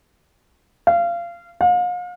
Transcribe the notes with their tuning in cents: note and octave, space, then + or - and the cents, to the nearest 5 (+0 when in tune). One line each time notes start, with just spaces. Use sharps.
F5 -25
F5 +40